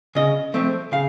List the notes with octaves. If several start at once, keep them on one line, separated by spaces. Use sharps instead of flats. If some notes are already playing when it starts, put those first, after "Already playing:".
C#3 D#5
F3 A3 C4
C#3 F5